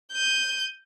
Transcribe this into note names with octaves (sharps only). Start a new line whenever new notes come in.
G6 D#7